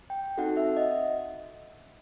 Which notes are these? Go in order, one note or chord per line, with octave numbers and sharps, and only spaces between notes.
G5
C4 D#4 F#4 A4 F#5
E5
D#5